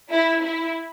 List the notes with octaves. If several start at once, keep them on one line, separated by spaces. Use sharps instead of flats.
E4
E4